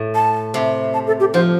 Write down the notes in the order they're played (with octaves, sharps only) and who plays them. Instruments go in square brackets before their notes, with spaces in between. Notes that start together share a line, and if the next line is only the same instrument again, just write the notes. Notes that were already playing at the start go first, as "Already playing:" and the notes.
Already playing: [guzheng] A2
[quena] A5
[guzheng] C3
[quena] A5
A4
G4
[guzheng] F3 [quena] C5